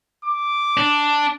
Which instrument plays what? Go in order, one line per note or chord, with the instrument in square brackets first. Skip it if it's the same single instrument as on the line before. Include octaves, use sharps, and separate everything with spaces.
[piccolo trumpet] D6
[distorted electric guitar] D4